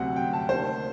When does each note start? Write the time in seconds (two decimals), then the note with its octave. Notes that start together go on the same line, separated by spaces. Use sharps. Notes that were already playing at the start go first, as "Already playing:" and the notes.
Already playing: D2 C3 F#3 C4 F#5
0.16 G5
0.33 A5
0.49 D2 C3 D#3 G3 A#3 C5